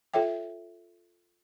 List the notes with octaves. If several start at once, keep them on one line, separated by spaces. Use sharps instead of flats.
F4 A4 C#5 E5 G5